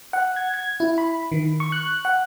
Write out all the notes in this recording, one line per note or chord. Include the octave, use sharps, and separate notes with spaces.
F#5
G#6
G#6
E4
B5
D#3
C#6
F#6
F#5